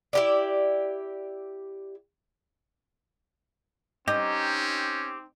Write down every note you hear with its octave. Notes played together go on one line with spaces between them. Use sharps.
E4 G4 D5
C4 C#4 D#4 G4